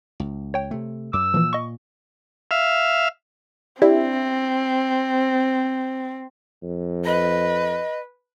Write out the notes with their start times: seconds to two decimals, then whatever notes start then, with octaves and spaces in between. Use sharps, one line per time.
0.20 C#2
0.54 C#5 G5
0.71 C3 A3
1.13 F#2 D6 E6
1.34 A#2 E3 F3
1.53 D#5 C#6
2.51 E5 F5
3.82 C4 D4 E4 G4
6.63 F2
7.05 B4 D#5